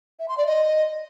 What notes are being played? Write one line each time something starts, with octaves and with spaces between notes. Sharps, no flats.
E5
C6
D5
D#5